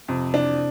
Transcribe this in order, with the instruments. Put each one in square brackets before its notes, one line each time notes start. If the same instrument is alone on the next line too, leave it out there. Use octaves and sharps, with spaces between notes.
[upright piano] F2 [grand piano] C3
[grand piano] E3 [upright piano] D4